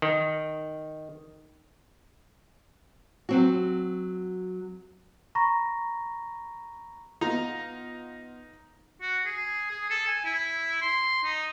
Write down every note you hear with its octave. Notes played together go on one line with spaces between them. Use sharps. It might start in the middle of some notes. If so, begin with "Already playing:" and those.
D#3
F#3 C4 F#4
A#5 B5 C#6 A#6
B3 D#4 F4 A#5
F#4
G#4
G#4
A4
G#5
E4
C6
D#4